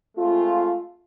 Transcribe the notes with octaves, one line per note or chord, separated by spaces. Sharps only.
G#3 A3 C4 F4